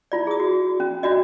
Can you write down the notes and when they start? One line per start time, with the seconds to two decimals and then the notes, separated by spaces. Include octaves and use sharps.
0.12 E4 F4 D5
0.27 G#4 D#6
0.40 F#4
0.80 C#4
1.03 D4 F4 F#4 D5 D#5